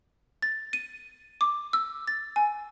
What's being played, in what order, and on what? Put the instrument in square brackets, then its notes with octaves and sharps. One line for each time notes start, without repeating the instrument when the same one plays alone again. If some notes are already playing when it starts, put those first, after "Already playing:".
[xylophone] A6
D#7
D6
E6
A6
G#5